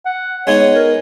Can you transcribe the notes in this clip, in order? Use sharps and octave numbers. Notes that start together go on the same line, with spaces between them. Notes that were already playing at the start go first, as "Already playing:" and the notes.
F#5
G#3 B3 D#4 C#5
A#4